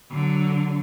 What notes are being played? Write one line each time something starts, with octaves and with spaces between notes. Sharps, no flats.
D3 F#3